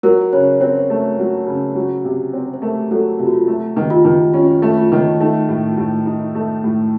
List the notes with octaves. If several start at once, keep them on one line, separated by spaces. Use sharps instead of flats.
F#3 A#4
C#3 C#5
C4 C5
A3
F#3
C#3
F#3
C3
C4
C5
A3 A#4
F#3 A4
C3 F4
F#4
F4
A3
D#3
F4
D#3
C#4 F4
A3
F4
D#3
A3 D#4
A2
F4
A2
D#4
A3
A2